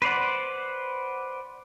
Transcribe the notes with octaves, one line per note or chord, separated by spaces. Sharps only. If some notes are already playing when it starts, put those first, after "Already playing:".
B4 C5 D5 F#5